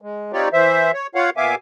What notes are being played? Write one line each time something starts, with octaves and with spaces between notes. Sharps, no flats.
G#3
C4 D#4 F4 G4 C#5 D5
E3 C5 E5
C#5
F4 C#5 F5 F#5
A#2 B3 E5 F5 G#5 D6